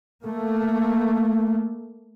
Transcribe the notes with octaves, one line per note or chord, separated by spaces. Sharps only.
A3 A#3